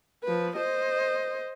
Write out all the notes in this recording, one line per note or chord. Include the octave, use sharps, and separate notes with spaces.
F3 B4
C5 D#5